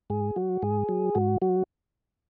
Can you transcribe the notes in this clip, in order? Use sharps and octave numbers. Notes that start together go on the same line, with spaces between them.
G#2 G#4
F#3 F#4
G#2 G#4
F#3
G#2 F#4
F#3 F#4